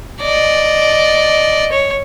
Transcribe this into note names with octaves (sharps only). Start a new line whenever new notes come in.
D5 D#5
C#5